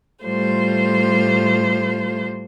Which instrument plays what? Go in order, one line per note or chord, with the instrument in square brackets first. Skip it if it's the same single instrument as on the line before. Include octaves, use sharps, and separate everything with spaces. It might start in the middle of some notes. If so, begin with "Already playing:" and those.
[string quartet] A2 G3 A3 F4 C5